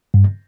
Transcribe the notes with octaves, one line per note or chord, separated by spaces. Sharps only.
G2